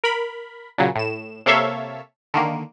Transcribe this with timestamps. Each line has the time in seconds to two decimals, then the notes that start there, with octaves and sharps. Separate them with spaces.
0.04 A#4 B5
0.78 A#2 C#3 F#3
0.96 A2 E7
1.46 C3 A#3 A4 C#5 E5 F5
2.34 D3 D#3 A#3